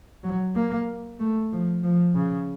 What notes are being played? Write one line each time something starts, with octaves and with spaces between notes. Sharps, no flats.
F#3
A#3
A3
F3
F3
C#3